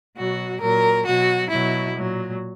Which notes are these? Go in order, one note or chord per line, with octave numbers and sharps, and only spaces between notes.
B2 F#3 F#4
A#2 F#3 A#4
B2 F#3 F#4
B2 F#3 E4
A#2 F#3